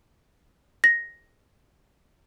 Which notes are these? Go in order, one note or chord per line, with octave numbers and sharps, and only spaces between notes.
A#6